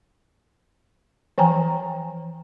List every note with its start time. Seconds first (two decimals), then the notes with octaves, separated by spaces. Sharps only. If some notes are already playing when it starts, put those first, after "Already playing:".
1.38 E3 F3 G5 G#5 A#5